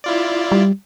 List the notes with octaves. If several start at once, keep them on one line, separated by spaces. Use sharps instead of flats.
E4 F4 D5
G3